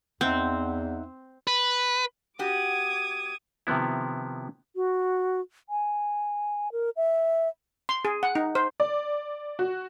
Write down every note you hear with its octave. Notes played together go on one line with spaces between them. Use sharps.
E2 C4 D#4 E5 F#5
B4
F#4 G4 D6 D#6 G#6
C3 D#3 F3 B3 E4
F#4
G#5
A#4
E5
C6
G#4
F#5
D#4
C5
D5
F#4